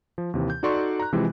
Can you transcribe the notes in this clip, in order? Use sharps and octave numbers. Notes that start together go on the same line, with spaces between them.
F3
D#2 C3 E3
G6
D#4 F#4 A4 D5 C6 C#6
A#5 F#6
C3 E3 F3 G#3